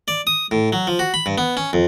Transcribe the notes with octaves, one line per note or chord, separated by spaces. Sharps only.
D5
D#6
A2
F#3
F3
F#4
B5
G2
B3
C#4
F2